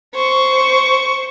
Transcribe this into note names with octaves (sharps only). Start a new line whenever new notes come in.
C5 C#6